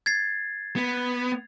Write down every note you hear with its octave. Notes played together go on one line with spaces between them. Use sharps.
G#6 A6 C7
B3